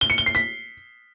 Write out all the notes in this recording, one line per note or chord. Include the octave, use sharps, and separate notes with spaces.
G7
C#7
G7
C7
B6